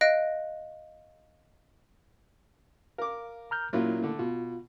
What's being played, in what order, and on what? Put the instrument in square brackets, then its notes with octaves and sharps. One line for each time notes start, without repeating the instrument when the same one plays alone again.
[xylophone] D#5 F5 F#6 A#6 D7
[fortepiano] A#4 D6 [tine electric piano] F5
[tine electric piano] A#5 F6 G6
[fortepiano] A#2 F#3 F4 [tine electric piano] A#3 C#4 E4
[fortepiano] D3 A3
[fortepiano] B2 [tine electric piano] F4